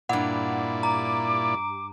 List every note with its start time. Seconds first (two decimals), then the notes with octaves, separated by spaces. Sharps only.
0.09 G2 A#2 E4 D5 F#5 G#5
0.83 A#5 D6